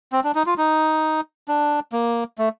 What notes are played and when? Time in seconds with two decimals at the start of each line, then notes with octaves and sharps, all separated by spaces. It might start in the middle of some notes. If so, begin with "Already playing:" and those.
0.12 C4
0.24 D4
0.35 D#4
0.46 F4
0.58 D#4
1.48 D4
1.92 A#3
2.38 A3